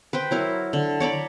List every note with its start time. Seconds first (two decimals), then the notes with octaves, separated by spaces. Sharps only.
0.13 B4 C5 G5
0.31 F#3 E4 A#4
0.73 D3
1.00 C#5 D5 A#5 B5